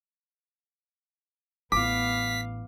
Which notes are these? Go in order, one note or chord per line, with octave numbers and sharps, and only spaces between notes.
A1 B3 F5 D6 B6